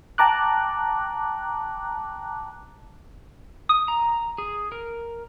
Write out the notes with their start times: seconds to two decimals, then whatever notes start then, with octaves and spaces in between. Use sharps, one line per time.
0.18 G5 A5 A#5 D6 F#6
3.69 D#6
3.88 A#5
4.38 G#4
4.72 A#4